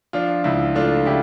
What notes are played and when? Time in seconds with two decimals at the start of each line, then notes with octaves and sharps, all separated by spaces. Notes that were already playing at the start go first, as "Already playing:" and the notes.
0.13 F3 D4 F4
0.44 C#2 E4
0.75 A3 D4 F4
1.06 C#3 E4 G4